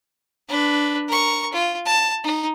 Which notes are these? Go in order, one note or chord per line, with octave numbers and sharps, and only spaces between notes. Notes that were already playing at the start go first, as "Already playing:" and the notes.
D4 B4
A#4 C#6
F4
A5
D#4